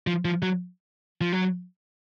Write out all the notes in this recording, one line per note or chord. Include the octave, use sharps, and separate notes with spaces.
F3
F3
F#3
F3
F#3